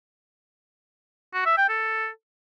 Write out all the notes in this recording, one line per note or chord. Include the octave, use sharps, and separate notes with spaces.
F#4
E5
G5
A4